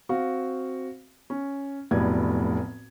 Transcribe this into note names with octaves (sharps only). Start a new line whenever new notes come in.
C4 F#4 F5
C#4
F1 B1 A2 B3 D5 G#6